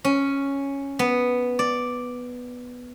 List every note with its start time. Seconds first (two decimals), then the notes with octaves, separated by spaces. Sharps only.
0.05 C#4
0.99 B3
1.59 D5